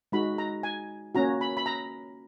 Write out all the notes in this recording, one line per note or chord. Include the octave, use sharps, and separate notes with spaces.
G#3 D#4 F#4 B5
A#5
G#5
A#3 C#4 F#4 A#5
B5
B5
A#5